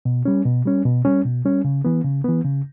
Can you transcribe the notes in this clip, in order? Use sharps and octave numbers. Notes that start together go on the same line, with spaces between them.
B2
G3 C#4
B2
G3 C#4
B2
G3 C#4
B2
G3 C#4
C#3
E3 B3
C#3
E3 B3
C#3